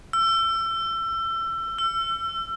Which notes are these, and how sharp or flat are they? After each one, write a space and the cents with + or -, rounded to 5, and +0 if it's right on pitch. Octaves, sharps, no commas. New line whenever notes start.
E6 +30
E6 +40